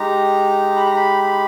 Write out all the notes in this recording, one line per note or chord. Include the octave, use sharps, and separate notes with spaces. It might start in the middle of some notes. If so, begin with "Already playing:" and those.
Already playing: G#3 D#4 G4 A#5
B5
A#5
B5
B5